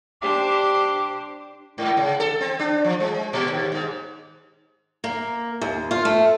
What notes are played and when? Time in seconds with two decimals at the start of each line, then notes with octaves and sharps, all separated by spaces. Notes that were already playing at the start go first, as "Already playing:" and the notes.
0.22 D4 G4 C5 D6
1.78 G#2
1.97 C#3
2.20 A4
2.41 C4
2.59 D4
2.85 F3
3.00 G#3
3.33 A#2
3.50 D#2
3.72 G#2
5.04 A#3
5.62 D#2
5.91 F4
6.05 A3